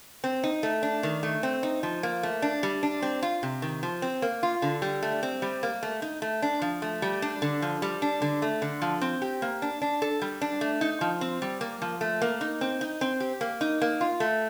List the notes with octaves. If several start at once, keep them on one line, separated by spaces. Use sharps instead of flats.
C4
D#4
A3
D4
D#3
A3
C4
D#4
F3
A#3
A3
D4
G3
D4
C4
F4
C3
D#3
F3
C4
A#3
F4
D3
G3
A3
C4
G3
A#3
A3
D#4
A3
D4
F3
A3
G3
D4
D3
F3
G3
D4
D3
A3
D3
F3
C4
G4
A#3
D4
D4
A4
G3
D4
A3
D#4
F3
C4
G3
A#3
F3
A3
A#3
D#4
C4
D#4
C4
G4
A#3
D#4
A#3
F4
A3